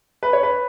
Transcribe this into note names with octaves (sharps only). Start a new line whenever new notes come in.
B4
C#5
B4